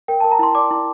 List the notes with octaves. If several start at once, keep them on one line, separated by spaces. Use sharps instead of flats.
A#4 G5
A#4 A5
A#5
E4 C6
D5 D6
E4